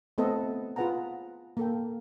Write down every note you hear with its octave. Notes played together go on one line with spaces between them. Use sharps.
A3 B3 C4 A4 B4 D#5
F4 G#4 B4 F#5 A5 A#5
A#3 A4 G5